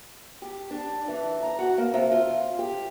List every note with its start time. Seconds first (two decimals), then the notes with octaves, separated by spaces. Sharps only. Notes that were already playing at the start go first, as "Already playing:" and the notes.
0.42 G4
0.71 D4
1.08 E3
1.42 A#5
1.59 F#4
1.78 A#3
1.94 C3
2.11 F4
2.59 G4